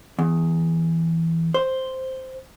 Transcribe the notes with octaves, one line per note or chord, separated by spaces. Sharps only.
E2
C5